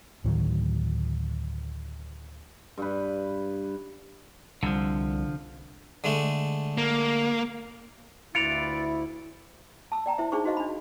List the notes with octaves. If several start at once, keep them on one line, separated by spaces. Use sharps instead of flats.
D2 A2 D#3 F#3
G2 B4
C2 D3 F3
D3 G#3 A3
A#3
D2 E4 F4 B4 D5 C#7 D7 F7
A5 E6
D5 G5 A#5
E4 C5 E5
D4 D#4 G#4 C5 C#6
D#4 F#4 C5 D#5 F5
D4 B5